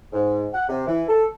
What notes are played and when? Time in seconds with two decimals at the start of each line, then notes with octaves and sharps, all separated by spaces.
0.13 G#2
0.52 F#5
0.69 C3
0.86 E3
1.08 A4